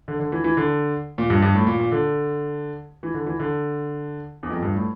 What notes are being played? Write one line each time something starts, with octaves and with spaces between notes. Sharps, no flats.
D3
D3
E3
E3
D3
A#2
G2
G2
A2
A#2
A#2
D3
E3
D3
E3
D3
E2
F2
G2
A2